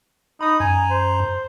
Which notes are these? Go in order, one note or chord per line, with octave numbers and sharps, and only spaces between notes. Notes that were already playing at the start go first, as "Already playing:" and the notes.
D#4 B5 D#6
F#2 G#5 A#5
C5